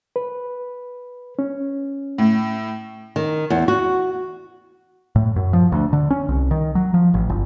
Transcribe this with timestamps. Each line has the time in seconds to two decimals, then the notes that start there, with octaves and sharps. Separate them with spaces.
0.16 B4
1.39 C#4
2.18 A2
3.16 D#3
3.50 E2
3.68 F#4
5.16 A2
5.36 F#2
5.53 F3
5.72 D2
5.93 D3
6.11 C#4
6.29 C2
6.51 D#3
6.75 F#3
6.94 F3
7.14 A1
7.29 G1